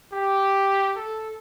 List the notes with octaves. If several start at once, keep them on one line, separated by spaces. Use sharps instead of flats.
G4
A4